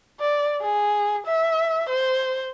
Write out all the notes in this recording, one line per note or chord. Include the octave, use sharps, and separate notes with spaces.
D5
G#4
E5
C5